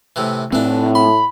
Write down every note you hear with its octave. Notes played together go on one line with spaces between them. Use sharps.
A2 C3 E3
A2 E3 A3 C4 D4
B5 C6